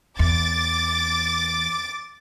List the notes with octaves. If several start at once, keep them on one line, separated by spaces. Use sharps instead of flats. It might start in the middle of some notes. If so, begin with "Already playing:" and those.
E2 D6 A6